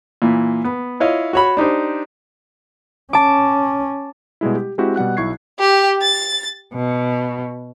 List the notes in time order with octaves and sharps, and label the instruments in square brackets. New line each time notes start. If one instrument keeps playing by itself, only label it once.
[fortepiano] A#2 E3
B3
E4 F4 C#5 D#5 F5
F#4 C#5 B5
D4 D#4 G4 C5
[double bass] C#4 [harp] A5 D6
[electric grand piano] B2 G3 G#3 E4
G4
G#3 C4 E4 F#4 G4
B2 G3 F#5 F#6
B1 E4 C#6 G#6 C7
[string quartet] G4
A6
B2